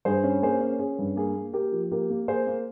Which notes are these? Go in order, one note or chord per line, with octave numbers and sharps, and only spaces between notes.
G2 G#4 C5
C#4
A#3 G#4 C5
C#4
C#4 G#4
G2
A#3 G#4
A#3
A#3 G4 A#4
F3
A#3 G4 A#4
A#3
A#3 G#4 C5
A#3